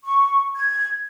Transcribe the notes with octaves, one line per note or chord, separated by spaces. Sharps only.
C#6
G#6